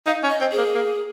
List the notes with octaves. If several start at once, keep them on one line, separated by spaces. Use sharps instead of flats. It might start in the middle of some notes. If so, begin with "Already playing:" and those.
D#4 F5
C#4
D#5
C4
G#4
A#3
A#3